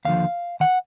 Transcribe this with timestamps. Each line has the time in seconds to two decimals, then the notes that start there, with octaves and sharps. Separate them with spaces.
0.05 D#2 D3 F3 F5
0.60 D#3 F#5